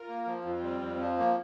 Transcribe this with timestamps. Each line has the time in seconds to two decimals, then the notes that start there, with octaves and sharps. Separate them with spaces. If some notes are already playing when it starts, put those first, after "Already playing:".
Already playing: F4 A#4
0.08 A#3
0.27 F3
0.44 F2 C4 F4
0.63 G3
0.81 F2
0.99 F3
1.18 A#3